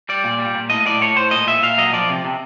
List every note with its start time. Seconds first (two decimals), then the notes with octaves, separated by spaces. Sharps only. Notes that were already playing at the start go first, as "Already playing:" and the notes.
0.09 G3 D5
0.24 A#2
0.39 G3
0.55 A#2
0.70 A2 D#5
0.86 A2 D5
1.01 A2 C#5
1.17 A2 C5
1.31 A#2 D#5
1.47 A#2 E5
1.63 A#2 F5
1.78 F#3 D#5
1.93 F3 D5
2.09 C3
2.25 C3